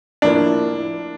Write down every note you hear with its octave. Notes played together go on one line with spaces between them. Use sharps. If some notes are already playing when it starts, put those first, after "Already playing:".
A2 F3 A#3 D4 E4